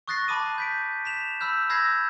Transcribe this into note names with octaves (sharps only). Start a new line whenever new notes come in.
C#6 D#6 F#6 A6 A#6 C7
A5 B5 D6 D#6 D#7
G6 B6 D7
B6 E7 F7
B5 E6 F6 G6
B5 E6 G6 G#6 A#6 C7